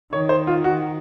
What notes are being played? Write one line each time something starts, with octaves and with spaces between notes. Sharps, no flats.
D#3 C#5
C5
F4
F#4